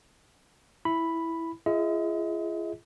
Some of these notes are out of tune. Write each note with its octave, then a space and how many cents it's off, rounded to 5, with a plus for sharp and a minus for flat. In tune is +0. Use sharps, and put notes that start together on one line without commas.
E4 +0 B5 +0
F4 -45 G#4 +0 D#5 +35